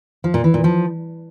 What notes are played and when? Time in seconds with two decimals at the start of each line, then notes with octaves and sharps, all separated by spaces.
0.24 F3
0.34 A#2
0.44 E3
0.54 A#2
0.64 F3